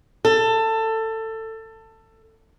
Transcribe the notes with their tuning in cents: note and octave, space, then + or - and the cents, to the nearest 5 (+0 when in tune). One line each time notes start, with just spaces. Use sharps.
A4 +20